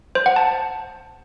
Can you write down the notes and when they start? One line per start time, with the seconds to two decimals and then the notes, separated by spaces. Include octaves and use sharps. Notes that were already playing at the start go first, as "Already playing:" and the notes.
0.15 C5
0.26 F#5
0.36 A5